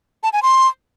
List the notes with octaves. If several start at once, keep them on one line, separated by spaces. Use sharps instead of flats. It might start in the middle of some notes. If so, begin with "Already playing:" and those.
A5
G#5
C6